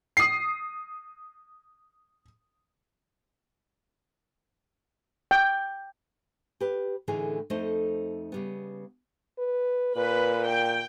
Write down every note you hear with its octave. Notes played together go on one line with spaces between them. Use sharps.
D#6 C7
G5
G4 B4
A2 D3 E3 A3 D#4 G#4
F2 A3 D#4 A4 C5 D#5
C#3 G3 B3
B4
A#2 B4
G5